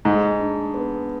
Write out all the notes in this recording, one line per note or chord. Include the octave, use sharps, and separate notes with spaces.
G#2 G#4
D4
B3